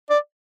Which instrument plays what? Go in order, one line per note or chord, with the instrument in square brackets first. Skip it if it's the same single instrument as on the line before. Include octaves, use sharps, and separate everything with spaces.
[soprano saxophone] D5